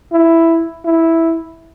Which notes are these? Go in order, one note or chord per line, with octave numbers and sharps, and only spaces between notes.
E4
E4